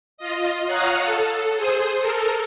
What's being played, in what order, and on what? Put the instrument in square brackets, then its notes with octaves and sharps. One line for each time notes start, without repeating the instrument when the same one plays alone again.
[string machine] F4 D#5
C#5 F5 F#5 A#5 D#6 F#6
A4
G#4 C5 D#6
A4 A#4